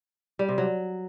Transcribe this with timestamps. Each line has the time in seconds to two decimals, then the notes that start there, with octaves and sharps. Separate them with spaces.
0.39 G3
0.49 C3
0.58 F#3